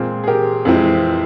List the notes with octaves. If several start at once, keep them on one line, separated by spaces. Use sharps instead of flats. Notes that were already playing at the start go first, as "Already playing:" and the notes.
Already playing: A#2 G#3 C4 F4 G#4
G#4
G4 A#4
F2 E3 G#3 C4